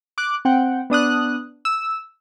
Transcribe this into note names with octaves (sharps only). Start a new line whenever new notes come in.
D6 F#6
C4 F#5 G5
B3 D4 D#6 F#6
E6